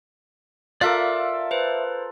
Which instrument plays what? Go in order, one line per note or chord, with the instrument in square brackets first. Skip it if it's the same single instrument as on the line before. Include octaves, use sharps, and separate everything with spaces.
[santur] F4 A4 A#4 [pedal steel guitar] D5 E5 D6 [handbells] F5 F#6
[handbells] B4 C5